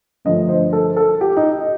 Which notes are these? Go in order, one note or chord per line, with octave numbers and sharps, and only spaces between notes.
G2 D3 F3 A3 D#5
C5
A4
A4
G4
D#4